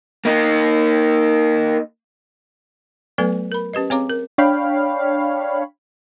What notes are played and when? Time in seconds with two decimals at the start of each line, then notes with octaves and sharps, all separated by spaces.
0.25 A#3 D#4
3.18 F#3 A3 B3 A4 B4 G#5
3.52 A#4 B5
3.74 C#4 G4 B4 D#5
3.90 C4 G#4 C#5 F5 A#5 D6
4.10 A#4
4.38 D4 C#5 F5 G5 B5